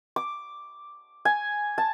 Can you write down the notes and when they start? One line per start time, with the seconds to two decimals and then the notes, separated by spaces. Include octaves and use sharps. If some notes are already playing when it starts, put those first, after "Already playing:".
0.16 D6
1.25 G#5
1.78 A5